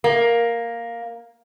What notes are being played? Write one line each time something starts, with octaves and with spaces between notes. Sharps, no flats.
A#3